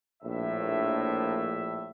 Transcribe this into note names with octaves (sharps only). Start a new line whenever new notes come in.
A#1 A2 E5